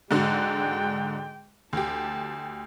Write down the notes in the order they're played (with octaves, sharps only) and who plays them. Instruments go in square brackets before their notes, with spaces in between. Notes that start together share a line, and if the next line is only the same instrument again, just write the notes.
[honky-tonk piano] G#2 D3 F#4 [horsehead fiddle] G#3 G5
[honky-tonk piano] D2 G4 [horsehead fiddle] A5